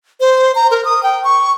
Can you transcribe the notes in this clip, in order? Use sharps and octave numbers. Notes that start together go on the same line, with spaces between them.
C5
A#5
A#4
D#6
G5
C#6